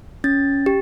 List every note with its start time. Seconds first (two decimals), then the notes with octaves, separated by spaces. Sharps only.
0.24 C#4 A6
0.66 G4